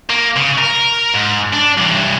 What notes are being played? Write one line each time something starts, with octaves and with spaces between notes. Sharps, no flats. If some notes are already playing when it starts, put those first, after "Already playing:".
A#3
C#3
A#4
G#2
D4
G2 E3